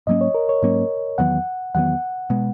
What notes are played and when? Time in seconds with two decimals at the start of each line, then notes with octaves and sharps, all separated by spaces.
0.07 G#2 F#3 A#3 C#4 D#5
0.21 C#5
0.35 A#4
0.49 C#5
0.62 G#2 F#3 A#3 C#4
1.18 E2 D#3 F#3 B3 F#5
1.75 E2 D#3 F#3 B3 F#5
2.30 B2 G#3 B3